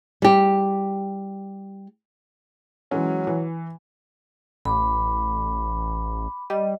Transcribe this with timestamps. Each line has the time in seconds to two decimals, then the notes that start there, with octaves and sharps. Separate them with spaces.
0.22 G3 G4
2.91 E3 F#3 G#3 C#4
3.27 E3
4.65 A1 B5 D6
6.50 G3 D#5